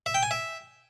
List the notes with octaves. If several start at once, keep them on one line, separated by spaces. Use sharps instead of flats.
E5
G5
G#5
E5